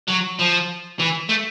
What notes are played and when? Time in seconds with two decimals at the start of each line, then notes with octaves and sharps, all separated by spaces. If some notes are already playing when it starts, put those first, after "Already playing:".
0.09 F#3
0.40 F3
0.99 E3
1.29 A3